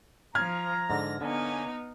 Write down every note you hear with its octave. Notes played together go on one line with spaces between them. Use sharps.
F3 A#5 F6 G#6
G#2 D3 A#6
D3 A#3 B3 C#4 D#4 G#5